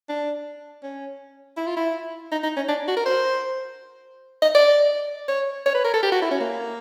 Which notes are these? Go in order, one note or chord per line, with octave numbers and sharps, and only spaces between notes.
D4
C#4
E4
F4
E4
D#4
D#4
C#4
D4
F#4
A#4
C5
D#5
D5
C#5
C#5
B4
A#4
A4
G4
F#4
E4
C#4
A#3